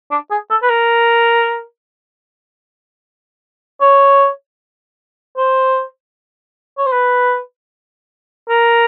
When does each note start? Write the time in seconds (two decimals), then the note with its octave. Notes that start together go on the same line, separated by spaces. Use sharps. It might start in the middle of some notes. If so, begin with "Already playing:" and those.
0.11 D4
0.31 G#4
0.50 A4
0.62 B4
0.70 A#4
3.81 C#5
5.37 C5
6.78 C#5
6.86 C5
6.93 B4
8.49 A#4